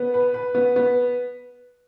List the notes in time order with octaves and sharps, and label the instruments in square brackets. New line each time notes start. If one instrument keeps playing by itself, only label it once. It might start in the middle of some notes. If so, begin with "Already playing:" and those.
Already playing: [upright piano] B3
B4
B4
B3
B3